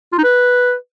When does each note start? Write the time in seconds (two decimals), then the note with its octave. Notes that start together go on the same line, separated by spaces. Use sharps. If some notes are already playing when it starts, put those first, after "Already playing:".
0.13 F4
0.18 D#4
0.24 B4